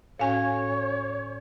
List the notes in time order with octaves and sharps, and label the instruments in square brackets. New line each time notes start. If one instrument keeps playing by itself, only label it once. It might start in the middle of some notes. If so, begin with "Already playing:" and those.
[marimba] A2 C#4 F#4 [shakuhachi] C#5 [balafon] F5 G#5